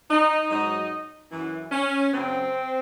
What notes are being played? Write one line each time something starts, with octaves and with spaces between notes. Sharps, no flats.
D#4
G#2 F#3 D#4
F#2 E3
C#4
F#2 C#3 F#3 C4